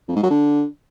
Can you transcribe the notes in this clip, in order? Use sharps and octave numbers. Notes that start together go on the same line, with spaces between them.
F2
G#2
F#3
D3